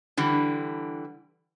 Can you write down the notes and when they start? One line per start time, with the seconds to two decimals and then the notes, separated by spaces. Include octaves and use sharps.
0.17 D3 E3 G3